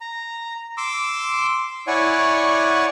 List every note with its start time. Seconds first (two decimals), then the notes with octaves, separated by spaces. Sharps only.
0.01 A#5
0.77 C6 D6 E6
1.87 E4 C#5 D5 F#5 G#5 C#6